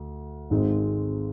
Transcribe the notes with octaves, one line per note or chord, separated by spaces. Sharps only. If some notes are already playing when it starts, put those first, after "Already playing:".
Already playing: D2
G#1 G#2 D#3 G#3 C4